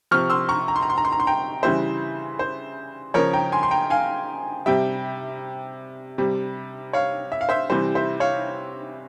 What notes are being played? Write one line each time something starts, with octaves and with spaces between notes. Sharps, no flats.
C3 F3 C#6 F6
C6 E6
A#5 C#6
A#5
C6
A#5
C6
A#5
C6
A#5
C6
G5 A#5
C#3 E3 G3 C5 E5
C5
C#3 F3 A#4 C#5
G5 A#5
G#5 C6
C6
G5 A#5
F5 G#5
C3 G3 E5 G5
C3 G3
C#5 F5
E5
F5
C5 E5
C3 E3 G3 C5
C5 E5
C#5 F5